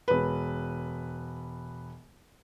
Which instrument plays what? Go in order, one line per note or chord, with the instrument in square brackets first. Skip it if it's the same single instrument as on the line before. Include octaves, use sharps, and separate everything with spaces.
[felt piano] E1 B4